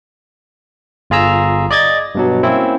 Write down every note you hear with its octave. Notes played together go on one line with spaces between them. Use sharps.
G1 F4 G#4 A#5 E6
D5 D#5 G#6 A6
G2 B2 F#3
A#3 C4 C#4 E4